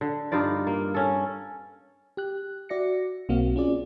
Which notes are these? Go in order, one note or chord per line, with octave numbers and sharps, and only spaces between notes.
D3
G2 D#4 F4 D5
A#3
C#4 A4
G4 F#6
F#4 D5 E5 A#6 C#7
B1 A#3 C4 F#4 F5
C#4 F4 G#4 D5